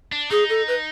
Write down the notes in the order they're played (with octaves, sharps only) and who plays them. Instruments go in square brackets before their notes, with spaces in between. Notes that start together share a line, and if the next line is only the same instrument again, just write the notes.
[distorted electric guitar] D4
[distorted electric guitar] D#4 [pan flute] G#4
[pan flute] A4
B4